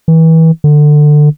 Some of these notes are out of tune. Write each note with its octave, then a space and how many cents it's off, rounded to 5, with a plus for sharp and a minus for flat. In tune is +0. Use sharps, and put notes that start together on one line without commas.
E3 -30
D3 +20